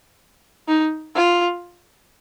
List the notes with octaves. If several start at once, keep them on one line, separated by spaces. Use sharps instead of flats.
D#4
F4